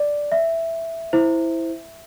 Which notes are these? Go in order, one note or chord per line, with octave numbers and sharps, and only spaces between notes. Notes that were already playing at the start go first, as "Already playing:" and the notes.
Already playing: D5
E5
E4 C5